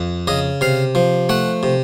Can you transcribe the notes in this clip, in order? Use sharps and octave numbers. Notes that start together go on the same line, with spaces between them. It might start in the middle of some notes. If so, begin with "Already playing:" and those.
Already playing: F2
C#3 D#5
C3 F5
F3
A3 F#5
C3